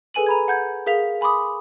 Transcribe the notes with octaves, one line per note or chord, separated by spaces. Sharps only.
G#4 A4 B4 G#5 D#7 F#7
A#5 B5 G#6
F#5 G6 G#6
G#4 A#4 F5 B6 F7
G#5 B5 C6 D6 D#6